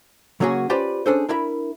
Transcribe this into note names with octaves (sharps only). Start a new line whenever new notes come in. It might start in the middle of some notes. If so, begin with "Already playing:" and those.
C#3 F#3 A#3 C#4 F#4 G#4
C#4 F4 G4 B4 C5 D5
C#4 D4 G#4 A4 C5
D4 E4 A#4 E5 B5